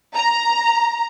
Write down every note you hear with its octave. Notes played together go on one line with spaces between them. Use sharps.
A#5